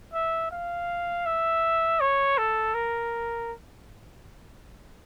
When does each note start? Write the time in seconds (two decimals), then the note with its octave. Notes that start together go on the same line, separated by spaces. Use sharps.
0.13 E5
0.51 F5
1.26 E5
2.01 C#5
2.38 A4
2.74 A#4